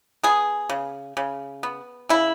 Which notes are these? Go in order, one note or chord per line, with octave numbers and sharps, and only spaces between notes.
B3 G#4
C#3
C#3
B3
C#3 E4